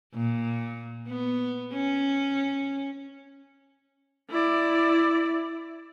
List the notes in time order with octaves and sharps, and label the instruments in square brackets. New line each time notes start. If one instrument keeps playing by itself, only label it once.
[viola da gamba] A#2
B3
C#4
[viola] E4 D5